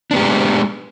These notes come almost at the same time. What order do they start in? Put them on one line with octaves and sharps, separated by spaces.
D4 B3 G4 G#3